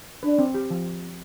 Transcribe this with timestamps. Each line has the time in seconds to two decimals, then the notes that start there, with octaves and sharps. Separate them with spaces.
0.23 D4 B4
0.39 C4
0.54 G4
0.71 F3